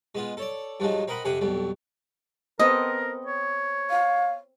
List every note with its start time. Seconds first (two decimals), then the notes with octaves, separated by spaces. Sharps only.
0.15 G#3 B3 F4
0.37 A4 C#5 D5
0.80 G2 F3 F#3 G#3 D#4
1.08 C4 A#4 D#5 F#5 B5
1.25 F2 C3 G4 F#5 G#5
1.41 B1 F2 G3
2.59 B3 C4 A4 A#4 D#5
3.26 C#5
3.90 F5